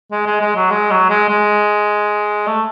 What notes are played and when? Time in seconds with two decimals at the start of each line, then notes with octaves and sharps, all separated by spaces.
0.12 G#3
0.26 G#3
0.41 G#3
0.56 F#3
0.71 G#3
0.91 F#3
1.09 G#3
1.29 G#3
2.47 A3